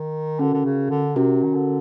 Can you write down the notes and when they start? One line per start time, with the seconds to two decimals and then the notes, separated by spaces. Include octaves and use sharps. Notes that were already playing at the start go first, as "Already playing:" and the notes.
Already playing: D#3
0.39 D3 C#4 F#4 A#4
0.54 D3
0.65 C#3
0.90 D3
1.16 C3 C#4 F#4 A#4
1.43 D#3
1.55 D3